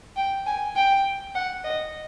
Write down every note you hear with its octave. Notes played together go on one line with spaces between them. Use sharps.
G5
G#5
G5
F#5
D#5